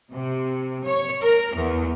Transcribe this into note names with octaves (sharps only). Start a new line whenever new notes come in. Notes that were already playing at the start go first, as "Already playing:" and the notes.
C3
C#5
A#4
E2